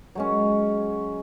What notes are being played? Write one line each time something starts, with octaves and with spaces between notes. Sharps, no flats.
F#3 G#3 C#4